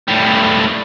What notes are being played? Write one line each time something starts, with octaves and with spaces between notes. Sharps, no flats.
A2 G3